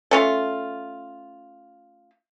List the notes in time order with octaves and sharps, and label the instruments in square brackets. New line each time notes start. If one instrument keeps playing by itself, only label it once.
[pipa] A3 C#4 F4